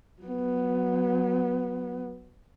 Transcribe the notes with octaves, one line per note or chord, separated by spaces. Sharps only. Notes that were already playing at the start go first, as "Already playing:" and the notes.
F#3 B3